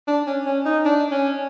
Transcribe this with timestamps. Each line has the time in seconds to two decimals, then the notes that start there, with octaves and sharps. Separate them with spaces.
0.07 D4
0.26 C#4
0.46 C#4
0.65 D#4
0.85 D4
1.12 C#4